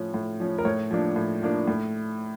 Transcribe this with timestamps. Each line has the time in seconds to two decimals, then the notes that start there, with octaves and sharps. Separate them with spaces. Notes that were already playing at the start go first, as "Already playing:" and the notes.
Already playing: A2 F3 C#4
0.14 A2
0.40 F3 C#4
0.58 A#4
0.65 A2 C#5
0.91 F3 A#3 D4
1.16 A2
1.42 F3 A#3 D4
1.68 A2